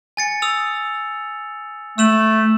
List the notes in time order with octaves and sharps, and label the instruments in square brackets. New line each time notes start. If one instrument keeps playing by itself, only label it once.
[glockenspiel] G#5 A6 C#7
D#6 E6 F7
[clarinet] A3 [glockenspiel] E6 E7 F#7